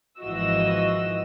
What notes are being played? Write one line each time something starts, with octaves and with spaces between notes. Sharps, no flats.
G#1 E3 F3 F#4 D#5 E6